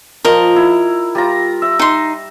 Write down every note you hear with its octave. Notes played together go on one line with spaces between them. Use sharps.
F3 A#4 D#5
E4
G3 F4 A#5
E5
D#4 C6